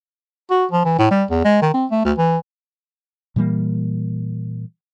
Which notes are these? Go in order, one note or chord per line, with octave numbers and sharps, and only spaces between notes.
F#4
F3
E3
A2
G3
E2
G#3
D#3
C4
A3
D2
E3
A#2 E3 G3 A#3